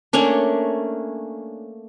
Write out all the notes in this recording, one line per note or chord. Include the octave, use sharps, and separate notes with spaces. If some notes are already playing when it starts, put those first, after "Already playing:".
A3 A#3 C#4 D4